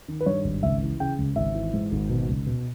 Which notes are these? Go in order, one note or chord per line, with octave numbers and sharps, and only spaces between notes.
D#3
B4
G2 C#5
G#1
C#2 E5
E3
C#3 G5
C#2
G#1 E5
E3
G#2
G#1
B2
C#2
B2